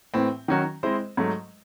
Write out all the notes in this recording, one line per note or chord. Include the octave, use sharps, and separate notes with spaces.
A2 E3 C4
D#3 F#3 C#4 F#4
G#3 C4 E4 C5 D#5
G#2 F#3 A3